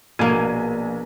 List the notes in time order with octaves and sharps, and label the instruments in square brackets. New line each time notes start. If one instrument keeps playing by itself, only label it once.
[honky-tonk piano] A#1 G#6 D#7 [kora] B2 A#3